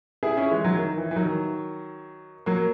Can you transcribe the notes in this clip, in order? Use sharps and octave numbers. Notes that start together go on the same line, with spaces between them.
E4 G#4
C#4 E4
E3 G#3
D#3 F#3
D#3
E3
E3
D#3 F#3
F#3 A#3